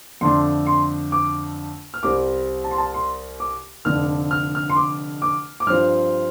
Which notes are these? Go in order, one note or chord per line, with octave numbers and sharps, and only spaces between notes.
F2 D3 A3 D4 C6
C6
D6
F6
C2 C3 G3 C4 D6
A5
C6
A5
C6
D6
F1 F2 D3 A3 D4 F6
F6
F6
C6
D6
D6
D6
G2 F3 C4 F6